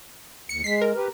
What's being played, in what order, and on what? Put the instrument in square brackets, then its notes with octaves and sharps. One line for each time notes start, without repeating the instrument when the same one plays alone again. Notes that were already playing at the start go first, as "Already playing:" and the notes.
[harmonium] D#2 [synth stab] C#7
[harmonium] G#3 [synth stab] B6 C7
[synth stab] A#4
[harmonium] G4 B4